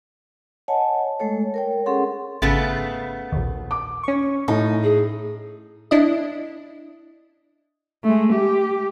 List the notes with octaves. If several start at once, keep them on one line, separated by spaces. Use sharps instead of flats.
C#5 D#5 F#5 G#5 A5
G#3 A3 A4 C#5
A#4 C#5 G5
C#4 G#4 A4 F#5 C6
G#1 C#3 A3 B3 A6
A#1 D#2
D6
C#4 C#6
A2 D#4
G#4
D4 E4 D#5
G#3 A3
G4